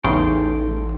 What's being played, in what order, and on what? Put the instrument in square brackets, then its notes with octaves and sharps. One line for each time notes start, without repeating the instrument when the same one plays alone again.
[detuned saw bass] A1 [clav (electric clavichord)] E2 C#3 [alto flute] D#4 [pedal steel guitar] A4 G5 C6